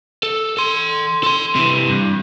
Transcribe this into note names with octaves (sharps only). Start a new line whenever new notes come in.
A4
A4 C6
A4 C6
C3 E3
G2